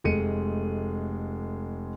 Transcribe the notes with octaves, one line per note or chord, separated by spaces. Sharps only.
F1 G#3 A3 C#7 D#7